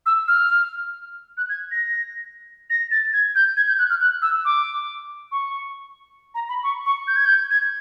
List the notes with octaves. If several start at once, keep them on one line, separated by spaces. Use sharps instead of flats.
E6
F6
F#6
G#6
A#6
A#6
A6
G#6
G6
G#6
G6
F#6
F6
F#6
E6
D6
C#6
A#5
B5
C#6
C#6
G6
G#6
G6
G#6